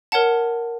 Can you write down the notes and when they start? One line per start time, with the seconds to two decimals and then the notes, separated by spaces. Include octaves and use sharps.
0.12 A#4 C#5 F#5 A5